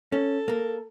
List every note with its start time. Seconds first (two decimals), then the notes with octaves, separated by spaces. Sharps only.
0.12 C#4 A4
0.48 A#3 A#4